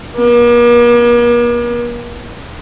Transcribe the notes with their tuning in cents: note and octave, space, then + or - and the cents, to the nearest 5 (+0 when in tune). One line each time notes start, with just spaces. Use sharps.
A#3 +45